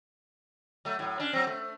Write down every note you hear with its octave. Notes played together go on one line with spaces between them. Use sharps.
F#3 A3
A2 F#3
C#4 D4
F#3 C4
A3